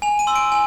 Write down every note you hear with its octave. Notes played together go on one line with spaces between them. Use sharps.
G#5 F7
D#7
C6 E6
D7
G#5